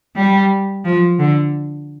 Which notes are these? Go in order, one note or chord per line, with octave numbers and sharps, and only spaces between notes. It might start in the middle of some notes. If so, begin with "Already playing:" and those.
G3
F3
D3